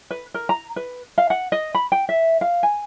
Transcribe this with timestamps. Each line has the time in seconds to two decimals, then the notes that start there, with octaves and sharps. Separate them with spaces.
0.11 B4
0.34 A#4
0.49 A#5
0.76 B4
1.18 F5
1.30 F#5
1.52 D#5
1.75 B5
1.92 G5
2.09 E5
2.41 F5
2.63 G#5